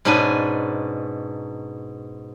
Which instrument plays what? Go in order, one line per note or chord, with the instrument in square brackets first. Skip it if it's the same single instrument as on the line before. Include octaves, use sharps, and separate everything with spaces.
[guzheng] G#2 B2 C#4 D4 B4 G#5